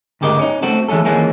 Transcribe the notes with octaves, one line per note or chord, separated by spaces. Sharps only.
D2 G#2 C#3 G4 A#4 D#5
C#4 D#4
A3 C4 F#4 A4
E3 G#3 A3 C#4 A4
D#2 E3 F3 G#3 A#3 C#4